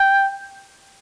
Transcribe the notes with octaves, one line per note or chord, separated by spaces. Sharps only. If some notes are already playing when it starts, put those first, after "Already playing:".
Already playing: G5